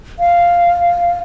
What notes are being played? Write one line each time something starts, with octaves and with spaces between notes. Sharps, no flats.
F5